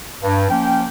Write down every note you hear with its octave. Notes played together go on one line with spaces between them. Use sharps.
G2
F3 A#3 C#4 G5